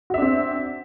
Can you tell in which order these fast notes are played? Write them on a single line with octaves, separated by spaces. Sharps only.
F#4 E5 D4 C4